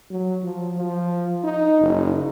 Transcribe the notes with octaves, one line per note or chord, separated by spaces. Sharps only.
F#3
F3
F3
D#4
F#1